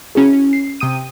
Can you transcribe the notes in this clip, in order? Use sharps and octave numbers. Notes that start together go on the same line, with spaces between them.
C#4 E4 F#4 G#4
C#4
C7
C3 G5 D#6 D#7